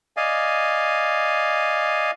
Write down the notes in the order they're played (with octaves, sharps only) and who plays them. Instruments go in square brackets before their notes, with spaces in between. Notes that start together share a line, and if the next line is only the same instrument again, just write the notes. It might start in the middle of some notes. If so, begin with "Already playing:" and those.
[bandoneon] D5 D#5 F5 G#5